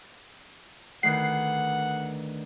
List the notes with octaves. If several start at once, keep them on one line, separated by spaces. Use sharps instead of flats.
D2 D#3 B4 F#5 C7